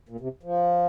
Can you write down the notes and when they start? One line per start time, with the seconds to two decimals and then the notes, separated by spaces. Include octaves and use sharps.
0.09 A#2
0.20 C3
0.43 F3